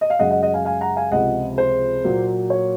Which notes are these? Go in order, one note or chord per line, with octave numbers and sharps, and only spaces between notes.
D#5
F5
F#2 C#3 G#3 D#5 F#5
D#5 F#5
D#5 F#5
F5 G#5
F5 G#5
F#5 A#5
F5 G#5
C#2 C3 F3 D#5 F#5
C5
A#2 F#3 A#3
C#5